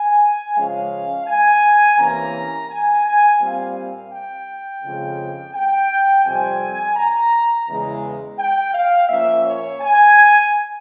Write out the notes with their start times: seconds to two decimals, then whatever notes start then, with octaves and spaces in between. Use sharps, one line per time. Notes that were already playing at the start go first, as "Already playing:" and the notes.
Already playing: G#5
0.56 C#3 F3 G#3 C#4 F5
1.26 G#5
1.98 C3 E3 A#3 C#4 A#5
2.69 G#5
3.05 G#5
3.40 A#2 G3 C4 F5
3.76 F5
4.11 G5
4.82 F2 C#3 F3 G#3
5.54 G5
6.25 F2 C3 G3 C4 G#5
6.96 A#5
7.67 E2 C#3 E3 G#3
8.38 G5
8.74 F5
9.09 A#2 F3 A#3 C#4 E5
9.45 C#5
9.81 G#5